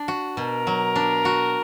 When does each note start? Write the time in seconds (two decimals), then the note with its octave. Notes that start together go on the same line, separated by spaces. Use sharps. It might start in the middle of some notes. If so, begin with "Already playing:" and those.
Already playing: D4
0.08 F#4
0.37 B2 A#4
0.67 F#3
0.96 D4
1.25 F#4